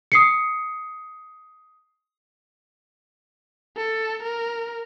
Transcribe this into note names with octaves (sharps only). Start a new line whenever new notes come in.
D#6 C7 C#7
A4
A#4